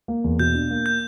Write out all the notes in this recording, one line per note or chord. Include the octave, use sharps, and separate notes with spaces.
A#3
E2
B2 G6
D4
A#3
G6